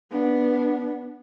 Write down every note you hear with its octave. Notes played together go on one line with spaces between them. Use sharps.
B3 D4